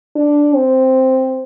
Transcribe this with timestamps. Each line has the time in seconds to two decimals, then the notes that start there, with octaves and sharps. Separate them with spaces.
0.16 D4
0.55 C4